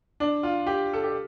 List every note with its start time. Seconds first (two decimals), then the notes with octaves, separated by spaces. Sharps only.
0.20 D4
0.43 F4
0.67 G4
0.93 A4
1.03 G4